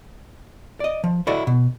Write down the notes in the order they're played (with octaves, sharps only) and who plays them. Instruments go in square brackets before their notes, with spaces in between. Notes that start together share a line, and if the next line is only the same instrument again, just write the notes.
[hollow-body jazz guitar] D5 D#5
F3
E4 F#4 A4 D5 D#5
B2